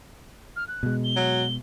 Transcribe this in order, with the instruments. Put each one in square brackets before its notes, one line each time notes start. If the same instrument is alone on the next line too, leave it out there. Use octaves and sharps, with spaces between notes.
[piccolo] F6
F#6
[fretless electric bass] B2 G#3
[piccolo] G7
[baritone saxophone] F#3